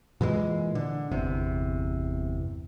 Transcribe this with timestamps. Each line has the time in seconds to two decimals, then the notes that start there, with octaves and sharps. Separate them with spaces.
0.21 A#2 E3 F3 G#3
0.75 D3
1.11 G1 E2 C3